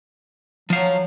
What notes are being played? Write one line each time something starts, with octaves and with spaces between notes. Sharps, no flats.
F3 F#3 F5